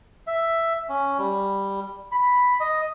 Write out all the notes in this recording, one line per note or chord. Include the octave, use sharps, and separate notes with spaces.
E5
C#4
G3
B5
D#5